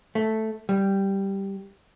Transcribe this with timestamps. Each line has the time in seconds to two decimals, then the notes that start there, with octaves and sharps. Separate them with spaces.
0.15 A3
0.69 G3